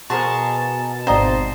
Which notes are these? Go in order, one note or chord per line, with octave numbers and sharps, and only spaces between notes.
B2 F#4 G#4 A#4 C5 A5 C6
G#1 C4 C5 D5 D#5 F5 A#5